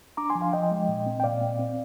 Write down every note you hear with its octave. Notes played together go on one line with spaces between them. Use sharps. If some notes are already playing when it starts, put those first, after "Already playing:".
D4 A#5 D6
G#5 C6
F3
F5 G#5
F3 D#5 G5
G#3
A#2
C4
G5
A#2 D5 F5
C4
C4